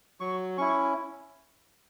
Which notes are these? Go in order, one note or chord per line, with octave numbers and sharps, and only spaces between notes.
F#3 C#6
C#4 E4 C#6